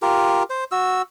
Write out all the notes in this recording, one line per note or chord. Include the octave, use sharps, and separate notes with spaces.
F4 G4 A#4
C5
F#4 E6